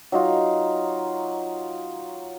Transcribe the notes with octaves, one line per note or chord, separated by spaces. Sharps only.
F#3 D#4 F4